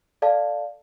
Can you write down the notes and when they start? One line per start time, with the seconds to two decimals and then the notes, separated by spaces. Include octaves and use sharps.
0.22 A4 D5 F5 A5